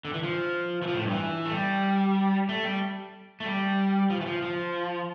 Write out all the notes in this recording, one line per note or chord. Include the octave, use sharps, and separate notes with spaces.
D3
E3
F3
E3
F3
A2
G2
E3
A3
G3
A3
G3
A3
G3
F3
E3
F3
F3